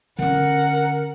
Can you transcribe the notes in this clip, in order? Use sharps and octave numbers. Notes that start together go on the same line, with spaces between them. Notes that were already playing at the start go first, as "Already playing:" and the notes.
D3 C#4 A#4 F#5